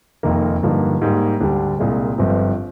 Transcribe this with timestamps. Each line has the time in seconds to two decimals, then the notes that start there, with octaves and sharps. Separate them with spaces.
0.23 F1 F2 D#3 A#3
0.63 G2 D3 F3 A#3 D#4
1.02 G#2 G3 A#3
1.40 D2 D3 G3 D4
1.79 C2 A#2 G#3
2.18 G1 G2 F3 C4